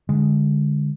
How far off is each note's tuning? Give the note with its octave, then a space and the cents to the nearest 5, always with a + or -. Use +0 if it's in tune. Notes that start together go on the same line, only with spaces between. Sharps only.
D3 +0 G#3 -10